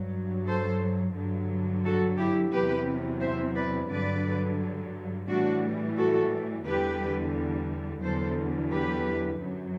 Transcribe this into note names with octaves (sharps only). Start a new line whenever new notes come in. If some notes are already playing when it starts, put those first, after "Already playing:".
Already playing: G2 F#3
A4 C5
G2 D3 F#3
F#4 A4
E4 G4
E2 C3 F#3 G4 B4
C5 E5
B4 D5
G2 D3 F#3 B4 D5
A2 E3 G3 D4 F#4
F#4 A4
E2 D3 G3 G4 B4
E2 D3 F#3 A4 C5
G4 B4
F#2 F#3